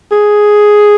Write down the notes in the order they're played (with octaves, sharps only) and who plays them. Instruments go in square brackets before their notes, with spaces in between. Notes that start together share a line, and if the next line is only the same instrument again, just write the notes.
[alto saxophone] G#4